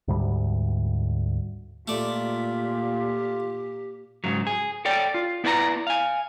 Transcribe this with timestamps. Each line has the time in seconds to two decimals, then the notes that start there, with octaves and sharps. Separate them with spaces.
0.08 D2 G#2 G3
1.88 A#2 A3 F4 G4 D5
4.24 G#2 C#3 F#3
4.47 G#4
4.85 A4 C#5 D5 G5
5.14 F4
5.44 B3 E4 B4 D5 A5 A#5
5.87 F5 G#5